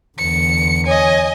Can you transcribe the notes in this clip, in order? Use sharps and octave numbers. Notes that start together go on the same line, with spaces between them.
E2 D3 C#7
C#5 D#5 G#5